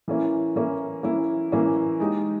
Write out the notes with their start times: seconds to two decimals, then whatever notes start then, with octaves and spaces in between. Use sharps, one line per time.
0.08 E3 A#3 C#4 E4
0.56 E3 A#3 C#4 E4
1.03 E3 A#3 C#4 E4
1.52 E3 A#3 C#4 E4
2.00 G#3 D#4 G4